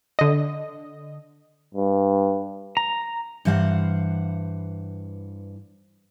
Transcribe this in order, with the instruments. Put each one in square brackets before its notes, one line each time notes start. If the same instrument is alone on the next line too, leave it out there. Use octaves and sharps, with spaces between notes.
[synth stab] D3 D#5
[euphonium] G2
[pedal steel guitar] A#5
[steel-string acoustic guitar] G2 E3 C5 F5 F#5